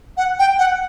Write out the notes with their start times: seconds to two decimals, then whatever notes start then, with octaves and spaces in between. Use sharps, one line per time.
0.17 F#5
0.39 G5
0.59 F#5